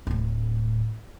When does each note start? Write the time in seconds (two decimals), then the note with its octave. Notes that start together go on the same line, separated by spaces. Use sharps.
0.07 D1 A2